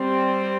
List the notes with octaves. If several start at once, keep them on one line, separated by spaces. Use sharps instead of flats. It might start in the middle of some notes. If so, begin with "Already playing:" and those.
Already playing: G3 C4